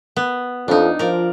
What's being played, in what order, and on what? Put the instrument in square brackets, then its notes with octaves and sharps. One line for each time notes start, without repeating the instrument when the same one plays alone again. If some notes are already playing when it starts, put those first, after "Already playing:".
[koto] B3
[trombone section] F2 [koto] D4 D#4
[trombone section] F3 F4 [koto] A#4 D5